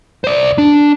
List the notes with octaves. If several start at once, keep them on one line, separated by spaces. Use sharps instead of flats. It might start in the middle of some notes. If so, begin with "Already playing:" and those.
C5 D5
D4